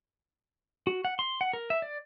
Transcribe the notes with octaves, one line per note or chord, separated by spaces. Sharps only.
F#4
F#5
C6
F#5
A#4
E5
D5